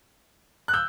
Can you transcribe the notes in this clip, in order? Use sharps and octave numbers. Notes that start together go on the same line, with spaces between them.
F#6
E6 G6